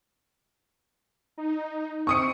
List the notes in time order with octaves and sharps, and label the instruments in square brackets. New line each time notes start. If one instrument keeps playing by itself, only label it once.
[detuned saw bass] D#4
[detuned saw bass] C4 [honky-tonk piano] C#6 D#6 C#7